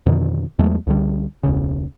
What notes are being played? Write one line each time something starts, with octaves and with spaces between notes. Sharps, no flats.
F2 B2 D3 D#3
E2 F#3 G#3 A3
C#2 D3 G3
E1 C#2 C#3